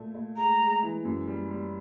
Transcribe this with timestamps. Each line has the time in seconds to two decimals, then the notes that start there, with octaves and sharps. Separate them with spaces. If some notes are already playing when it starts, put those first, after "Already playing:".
Already playing: A#2 A3 F4
0.14 A3
0.37 G#3 A#5
0.60 G#3
0.82 E3
1.05 F#2
1.27 G3
1.50 G3